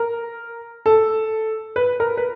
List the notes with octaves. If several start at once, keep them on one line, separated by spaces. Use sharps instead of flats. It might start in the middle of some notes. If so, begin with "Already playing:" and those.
Already playing: A#4
A4
B4
A#4
B4